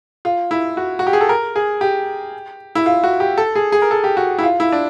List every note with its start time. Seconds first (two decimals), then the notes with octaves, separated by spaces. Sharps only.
0.25 F4
0.51 E4
0.77 F#4
0.99 F#4
1.07 G4
1.13 G#4
1.21 A4
1.29 A#4
1.56 G#4
1.81 G4
2.75 E4
2.86 F4
3.04 F#4
3.20 G4
3.38 A4
3.56 G#4
3.72 G#4
3.82 A#4
3.91 A4
4.04 G4
4.17 F#4
4.39 E4
4.43 F4
4.60 E4
4.72 D4